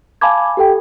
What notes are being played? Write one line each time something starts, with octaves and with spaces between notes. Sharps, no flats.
F5 G#5 A5 B5 D6 G#6
G4 A4 G5